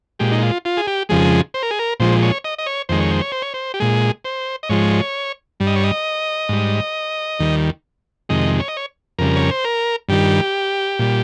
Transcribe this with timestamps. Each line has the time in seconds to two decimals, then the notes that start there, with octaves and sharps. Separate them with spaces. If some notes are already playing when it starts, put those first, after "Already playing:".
0.19 A#2 G#3 G4
0.32 D#4
0.42 F4
0.65 F4
0.77 G#4
0.87 G4
1.09 F2 C#3 F3 G#3 G#4
1.54 C5
1.63 A#4
1.71 G#4
1.79 A#4
2.00 A#2 F3 G#3 C5
2.23 C#5
2.44 D#5
2.58 D#5
2.66 C#5
2.89 F2 D#3 G#3 C5
3.00 C#5
3.11 C5
3.21 C#5
3.32 C5
3.42 C#5
3.54 C5
3.74 G4
3.80 A#2 G#3 G#4
4.25 C5
4.63 D#5
4.69 G#2 F3 G#3 C#5
5.60 G2 G3
5.67 D#5
5.76 C#5
5.84 D#5
6.49 G#2 G3
7.40 D#2 D#3 G3
8.29 F2 C3 D#3 G#3 D#5
8.60 C#5
8.68 D#5
8.77 C#5
9.19 F2 C#3 G3 A#4
9.36 C#5
9.51 C5
9.65 A#4
10.09 G2 D#3 G3 G4
10.99 A#2 G3